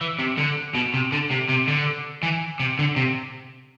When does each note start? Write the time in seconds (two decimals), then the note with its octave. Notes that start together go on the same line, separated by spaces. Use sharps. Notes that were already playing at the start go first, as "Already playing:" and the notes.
0.01 E3
0.19 C3
0.38 D3
0.75 B2
0.94 C3
1.12 D3
1.31 C3
1.49 C3
1.68 D3
2.23 E3
2.60 C3
2.79 D3
2.96 C3